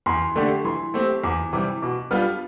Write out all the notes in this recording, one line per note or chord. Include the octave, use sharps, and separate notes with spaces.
E2 C6
D3 A3 D4 G4
E3 C6
A3 C4 G4
E2 D6
C3 E3 G3 D6
B2 D6
G3 B3 D4 F4 F6